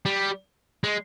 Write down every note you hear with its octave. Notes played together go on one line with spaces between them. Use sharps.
G3
G#3